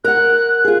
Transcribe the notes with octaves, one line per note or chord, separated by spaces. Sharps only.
A#4 F#5 F#6
F4 G#4